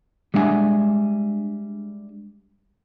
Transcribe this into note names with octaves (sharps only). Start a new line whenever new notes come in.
G3 G#3 D4 E5 F#5 G#5